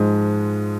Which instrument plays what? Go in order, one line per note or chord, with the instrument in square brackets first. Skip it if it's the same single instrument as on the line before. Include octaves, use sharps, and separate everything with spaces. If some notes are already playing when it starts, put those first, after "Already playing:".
Already playing: [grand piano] G#2 F3 G#3